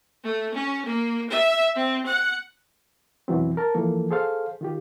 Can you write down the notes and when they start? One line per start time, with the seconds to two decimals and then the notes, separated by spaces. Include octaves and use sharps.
0.23 A3
0.54 C#4
0.85 A#3
1.30 E5
1.75 C4
2.06 F#5
3.28 F2 B2 E3 F#3 C4
3.57 A#4 A5
3.74 E3 F3 A#3 A4
4.11 G#4 A4 C5 F5
4.61 D#3 F4 G4